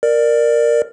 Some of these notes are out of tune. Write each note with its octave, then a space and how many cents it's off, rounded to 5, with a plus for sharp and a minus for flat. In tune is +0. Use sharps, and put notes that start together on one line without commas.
A#4 +0 D5 +15